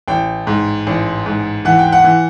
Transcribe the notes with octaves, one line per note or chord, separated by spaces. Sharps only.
A1 G5
G#2
A1
G#2
E3 F#5
G5
F#5
E3